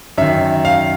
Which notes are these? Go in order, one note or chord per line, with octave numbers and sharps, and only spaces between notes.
F#2 D#3 E5
F5